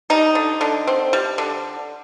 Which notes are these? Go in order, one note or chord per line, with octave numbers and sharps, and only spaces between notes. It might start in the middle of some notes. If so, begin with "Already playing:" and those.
G3 D#4
D3
D3
C4
G3
D3